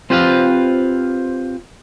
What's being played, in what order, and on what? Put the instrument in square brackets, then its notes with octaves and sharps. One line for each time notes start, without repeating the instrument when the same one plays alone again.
[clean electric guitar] C4 F4 G4 B4 C5 F5